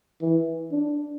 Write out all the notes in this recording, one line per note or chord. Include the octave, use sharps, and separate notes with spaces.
E3
D4